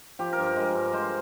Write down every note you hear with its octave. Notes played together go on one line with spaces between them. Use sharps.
F3 G4
A#4
G2
A#4
G#3 A#4
G2
G#3 C5